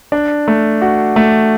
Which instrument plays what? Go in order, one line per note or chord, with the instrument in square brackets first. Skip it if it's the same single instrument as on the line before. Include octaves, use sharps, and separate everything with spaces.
[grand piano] D4
A3
F#4
A3